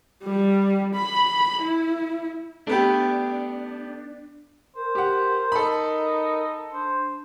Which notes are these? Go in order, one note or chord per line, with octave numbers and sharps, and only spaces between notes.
G3
B5
E4
A3 B3 D4 G4
A#4 C5
G4 F#5
D#4 A4 B5
D4 C5